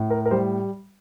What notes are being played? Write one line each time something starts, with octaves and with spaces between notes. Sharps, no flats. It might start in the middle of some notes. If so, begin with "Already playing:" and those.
Already playing: A2
A#4
A#4
G3 C5